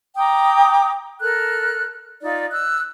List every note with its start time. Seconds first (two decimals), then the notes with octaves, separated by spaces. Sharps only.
0.17 G5 A#5 D6 D#6
1.22 A4 A#4 F6 F#6
2.23 D#4 F4 D5
2.50 E6 F#6